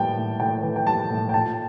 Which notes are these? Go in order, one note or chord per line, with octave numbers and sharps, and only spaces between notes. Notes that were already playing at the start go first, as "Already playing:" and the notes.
Already playing: A2 E3 G3 G5 A5
A2
A2 G5
E3
G5
G3 A5
A2
G5
A#2 A5